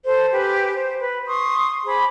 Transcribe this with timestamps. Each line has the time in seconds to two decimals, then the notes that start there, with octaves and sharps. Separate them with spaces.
0.05 A4 C5
0.32 G4 B4 G#5
0.72 C5
1.01 B4
1.26 C6 C#6 D#6
1.85 G#4 C5 B5 D6